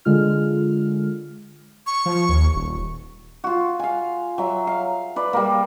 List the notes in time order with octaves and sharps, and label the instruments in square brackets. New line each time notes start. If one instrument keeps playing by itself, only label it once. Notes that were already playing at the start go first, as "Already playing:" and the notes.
[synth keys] D3 G#3 F4 F6
[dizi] C#6
[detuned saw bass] F3
D#2
D#1
[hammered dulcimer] F4 F#4
F5 G#5
F#3 E5
F5
B4 D5
G3 A#3